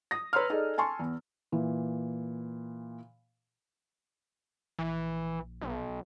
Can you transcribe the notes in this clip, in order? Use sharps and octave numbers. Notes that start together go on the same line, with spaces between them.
D#6 A#6
B4 C#5 A#5 C6 E6 F6
D#4 G#4 A4 D5 D#5
G#5 A5 C6 C#6
E2
A#2 E3
A#1 E3
B1